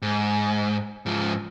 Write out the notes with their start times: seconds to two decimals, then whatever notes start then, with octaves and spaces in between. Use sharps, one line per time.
0.02 G#2
1.06 G#2 F3